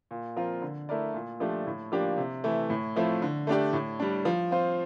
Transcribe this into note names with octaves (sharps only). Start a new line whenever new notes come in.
A#2
F3 C4 F4 A#4
D3
A3 E4 A#4 D5
A#2
F3 A3 D4 G4
A2
F3 A#3 D4 G4
C3
E3 A3 E4
A2
F3 A3 C4 E4
D3
A3 D4 G4 D5
A2
G3 D4
F3
C4 F4 C5